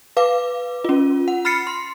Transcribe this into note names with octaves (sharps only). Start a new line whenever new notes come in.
B4 F5 D6
C#4 F4
F#5
B5 F6 A6 C7 C#7
C6